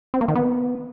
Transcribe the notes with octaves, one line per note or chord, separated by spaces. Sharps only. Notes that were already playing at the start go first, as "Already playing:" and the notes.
C4
A#3
D#3
B3